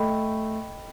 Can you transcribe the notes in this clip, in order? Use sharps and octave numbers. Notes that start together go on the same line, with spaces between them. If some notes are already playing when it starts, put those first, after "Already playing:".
Already playing: A3 A4 D#5 G5 B5